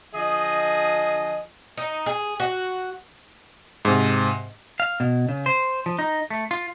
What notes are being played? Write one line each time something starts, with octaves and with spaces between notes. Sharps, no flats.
D3 F3 G#4 D#5
D#4
G#4
F#4
G#2 C3
F5
B2
C#3
C5
F3
D#4
A3
F4